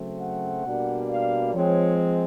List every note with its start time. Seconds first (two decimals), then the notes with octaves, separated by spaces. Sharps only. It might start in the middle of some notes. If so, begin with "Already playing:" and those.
Already playing: C#3 F#3 A3 C4
0.20 F#5
0.65 B2 G3 A#3 D4
1.09 F5
1.54 F3 G#3 C4 C#5